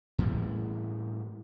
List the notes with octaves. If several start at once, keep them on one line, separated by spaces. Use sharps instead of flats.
A2 E3 G3 G#3